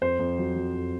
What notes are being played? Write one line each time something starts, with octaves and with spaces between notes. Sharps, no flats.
F2 C5
F2
F#3
F#3
F2